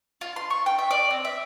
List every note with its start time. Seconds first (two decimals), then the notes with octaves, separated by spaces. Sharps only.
0.21 F4
0.36 C6
0.50 C#6
0.66 G5
0.79 E5
0.91 D5
1.11 C4
1.25 E5